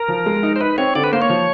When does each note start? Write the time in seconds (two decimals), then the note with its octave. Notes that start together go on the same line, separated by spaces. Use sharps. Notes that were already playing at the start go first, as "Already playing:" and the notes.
Already playing: A#4
0.08 F3
0.26 G#3
0.43 D#4
0.56 C5
0.60 D#4 B4
0.78 C4 C#5
0.95 D3 D5
1.04 B4
1.13 A#3 C5
1.22 C#5
1.29 F3